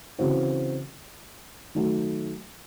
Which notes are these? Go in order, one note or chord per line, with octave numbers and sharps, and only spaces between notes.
C#3 E3 C4 F#4
D#3 F#3 A3